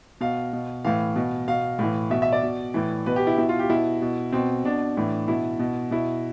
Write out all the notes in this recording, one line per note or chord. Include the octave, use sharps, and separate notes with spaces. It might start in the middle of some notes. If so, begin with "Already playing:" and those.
B2 F5
B2
A2 E3 F5
B2
B2 F5
A2 E3
B2 E5
E5
D5
B2
A2 E3
B2 B4
G4
E4
B2 E4
F4
G4
B2 E4
B2
B2 C4
B2 D4
A2 E3
B2 E4
B2
B2 E4